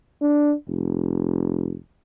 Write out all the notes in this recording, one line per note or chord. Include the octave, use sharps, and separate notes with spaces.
D4
F1